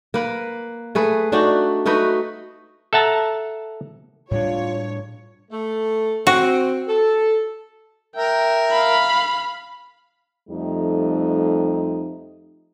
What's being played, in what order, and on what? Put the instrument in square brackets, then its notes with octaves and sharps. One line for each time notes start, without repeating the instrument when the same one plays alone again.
[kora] A#3 B4
A3 G#4 B4
A3 D4 D#4 F#4
A3 D#4 F#4 B4
[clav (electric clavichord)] A4 E5 F#5 A5 A#5
[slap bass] A2 G3 D4 [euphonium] F4 [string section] C#5
[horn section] A3
[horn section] C4 [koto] F#4
[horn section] A4
[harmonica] A#4 E5 [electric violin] G5
[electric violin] F5 B5
[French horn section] F2 G3 A3 D#4